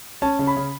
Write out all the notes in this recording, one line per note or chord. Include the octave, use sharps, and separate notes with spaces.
C#4 A5
C#3
B5
C#3